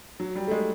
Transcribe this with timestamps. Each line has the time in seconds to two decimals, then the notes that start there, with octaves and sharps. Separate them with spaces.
0.20 F#3
0.35 G3
0.47 A3
0.51 G#3